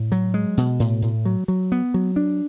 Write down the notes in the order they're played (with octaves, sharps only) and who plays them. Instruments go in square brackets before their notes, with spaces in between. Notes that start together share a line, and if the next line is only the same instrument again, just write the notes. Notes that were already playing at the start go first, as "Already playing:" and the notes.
Already playing: [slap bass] A2
F#3
G#3
B2
A2
A2
F#3
F#3
B3
F#3
D4